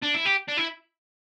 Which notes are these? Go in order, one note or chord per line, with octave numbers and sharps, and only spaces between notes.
D4
E4
G4
D4
E4